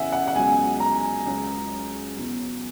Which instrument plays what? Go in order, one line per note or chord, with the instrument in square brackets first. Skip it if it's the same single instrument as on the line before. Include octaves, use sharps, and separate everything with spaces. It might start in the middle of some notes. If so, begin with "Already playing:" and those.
Already playing: [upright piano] E2 C#3 E3 E5 F#5 G#5
F#5
F#5
C#2 B2 F#3 G#5
A#5
C#2 C#3 F#3
E2 B2 F#3